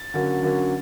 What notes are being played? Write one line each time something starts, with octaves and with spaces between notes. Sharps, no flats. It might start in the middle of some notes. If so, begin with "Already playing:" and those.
Already playing: A6
D3 F#3 A#3 C#4
D3 F#3 A#3 C#4